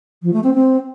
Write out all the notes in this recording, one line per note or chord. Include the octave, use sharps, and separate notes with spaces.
F3
A3
C4
C4